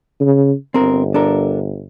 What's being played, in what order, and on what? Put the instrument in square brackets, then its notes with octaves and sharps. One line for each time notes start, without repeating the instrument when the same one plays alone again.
[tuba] C#3
[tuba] G1 [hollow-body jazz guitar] C4 A#4
[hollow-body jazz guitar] D4 A4 A#4